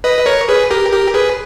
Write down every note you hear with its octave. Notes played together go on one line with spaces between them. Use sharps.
B4 D#5
B4
A#4 C#5
G#4 B4
G4 A#4
G4 A#4
G#4 B4